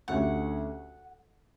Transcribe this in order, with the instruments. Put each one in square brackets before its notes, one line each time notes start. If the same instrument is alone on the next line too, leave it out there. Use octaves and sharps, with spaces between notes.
[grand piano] D2 D3 A3 C#4 G4 [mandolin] F#5